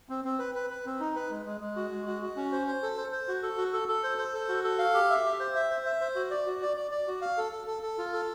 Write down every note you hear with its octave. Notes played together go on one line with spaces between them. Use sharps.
C4
C4
B4
B4
B4
C4
D#4
B4
G#3
G#3
G#3
F#4
G#3
F#4
F#4
C#4
C5
C5
A4
C5
C5
F#4
A4
F#4
A4
A4
C5
C5
A4
F#4
A4
F5
G4
E5
G4
C5
E5
C5
E5
C5
F#4
D5
F#4
D5
D5
D5
F#4
F5
A4
A4
A4
A4
F4
A4